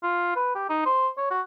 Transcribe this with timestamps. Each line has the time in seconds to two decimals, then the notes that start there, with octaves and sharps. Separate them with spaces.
0.03 F4
0.36 B4
0.55 G4
0.69 D#4
0.85 C5
1.18 C#5
1.31 F#4